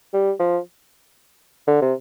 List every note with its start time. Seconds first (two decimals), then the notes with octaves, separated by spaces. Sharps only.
0.13 G3
0.39 F3
1.67 D3
1.82 C3